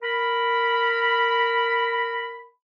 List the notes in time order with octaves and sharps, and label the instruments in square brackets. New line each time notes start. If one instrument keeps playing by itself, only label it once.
[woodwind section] A#4 B5